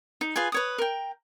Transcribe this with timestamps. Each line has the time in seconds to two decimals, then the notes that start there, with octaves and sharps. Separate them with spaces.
0.21 D#4
0.36 F4 G#4 B4 G#5
0.52 B4 C#5 D#6
0.78 A#4 G5